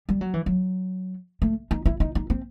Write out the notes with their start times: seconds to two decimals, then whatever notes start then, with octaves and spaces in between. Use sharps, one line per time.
0.09 G3
0.21 F#3
0.34 E3
0.46 F#3
1.42 A3
1.71 D#4
1.86 E4
2.00 D#4
2.15 D#4
2.30 C4